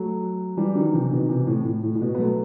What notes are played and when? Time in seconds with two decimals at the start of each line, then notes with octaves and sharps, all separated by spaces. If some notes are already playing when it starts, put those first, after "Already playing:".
Already playing: F#3 A3
0.57 E3 G3
0.75 D#3 F#3
0.93 C3 E3
1.11 B2 D#3
1.29 C3 E3
1.47 A2
1.65 A2
1.83 A2
1.95 A2
2.01 B2
2.15 B3
2.18 F#3 A3